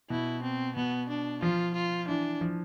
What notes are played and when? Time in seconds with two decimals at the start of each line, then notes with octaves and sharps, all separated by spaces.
0.10 B2 E4
0.44 C4
0.76 B2 B3
1.10 D4
1.42 F3 F4
1.75 F4
2.09 E3 D4
2.41 F3